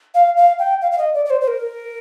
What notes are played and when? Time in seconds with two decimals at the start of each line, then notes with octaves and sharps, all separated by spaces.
0.14 F5
0.37 F5
0.59 G5
0.82 F5
0.92 F5
0.98 D#5
1.14 D5
1.25 D5
1.30 C5
1.41 C5
1.48 A#4